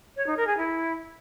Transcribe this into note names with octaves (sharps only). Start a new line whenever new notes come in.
C#5
D#4
A#4
G#4
E4